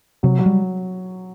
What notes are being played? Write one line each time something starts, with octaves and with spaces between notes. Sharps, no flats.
C3 F#3
F#3
G3